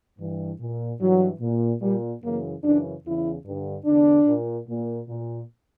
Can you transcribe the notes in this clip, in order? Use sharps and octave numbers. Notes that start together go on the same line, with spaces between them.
G2 E3
A#2
G2 E3 F#3
A#2
A#2 G3
F#2 C#3 E3 A#3
F#2 C#3 E3 D4
E2 C#3 E3 E4
G2 D3
E2 D3 D4
A#2
A#2
A#2